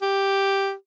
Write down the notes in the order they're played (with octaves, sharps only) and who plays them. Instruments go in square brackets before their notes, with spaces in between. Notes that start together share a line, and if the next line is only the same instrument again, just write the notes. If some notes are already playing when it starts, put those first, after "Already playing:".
[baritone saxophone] G4